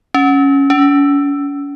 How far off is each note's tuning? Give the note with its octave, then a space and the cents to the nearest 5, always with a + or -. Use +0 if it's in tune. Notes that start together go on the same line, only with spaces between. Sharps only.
C#4 +0
C#4 +40